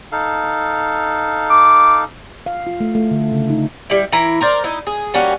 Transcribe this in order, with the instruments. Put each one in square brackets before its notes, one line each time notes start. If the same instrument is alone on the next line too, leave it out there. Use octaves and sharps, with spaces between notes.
[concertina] D#4 A4 F5
[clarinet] D6
[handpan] F5
F4
A3
A3
D3
C#3
D#4
[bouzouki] G3 E4
E3 E4 A#5
A#4 C5 D5
D#4 E4
G#4
G3 A#3 C#4 F#4